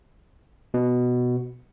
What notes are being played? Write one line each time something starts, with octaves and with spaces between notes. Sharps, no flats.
B2